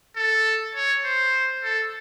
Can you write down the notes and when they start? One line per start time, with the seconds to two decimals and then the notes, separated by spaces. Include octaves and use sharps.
0.16 A4
0.75 C#5
1.05 C5
1.63 A4